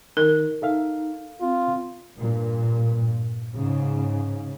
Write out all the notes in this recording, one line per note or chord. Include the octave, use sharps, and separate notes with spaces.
D#3 D#4 A#4
D#4 A4 E5 F5
C4 F4
G2 A#2
G#2 C#3